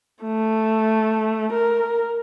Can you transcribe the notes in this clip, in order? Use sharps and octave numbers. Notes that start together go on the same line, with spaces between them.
A3
A#4